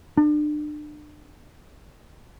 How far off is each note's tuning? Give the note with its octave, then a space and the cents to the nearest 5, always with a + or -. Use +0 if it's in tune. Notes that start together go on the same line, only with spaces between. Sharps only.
D4 +35